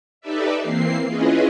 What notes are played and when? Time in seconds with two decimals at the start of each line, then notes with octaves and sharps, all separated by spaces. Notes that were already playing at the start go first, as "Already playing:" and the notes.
0.21 D#4 G4 A4 B4 D5 E5
0.62 E3 A#3 C4 C7
1.07 C#4 E4 F4 G#4 B4 D#5